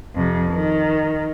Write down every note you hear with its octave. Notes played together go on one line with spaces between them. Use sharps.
F2 C3
D#3